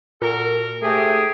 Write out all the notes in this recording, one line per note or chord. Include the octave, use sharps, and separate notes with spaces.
A#2 A#3 F#4 A4 A#4
G#2 C3 A3 G4 G#4